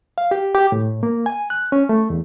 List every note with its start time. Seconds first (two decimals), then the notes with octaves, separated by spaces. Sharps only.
0.18 F5
0.31 G4
0.55 G4
0.72 A2
1.03 A#3
1.26 G#5
1.50 F#6
1.72 C#4
1.89 A3
2.10 E2